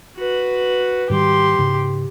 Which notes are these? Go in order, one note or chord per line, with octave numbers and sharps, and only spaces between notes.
F#4 B4
G#2 D#3 G3 G4 C6
G#2 C#3